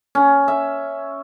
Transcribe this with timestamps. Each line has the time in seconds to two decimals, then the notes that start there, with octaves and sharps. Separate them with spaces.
0.15 C#4
0.48 E5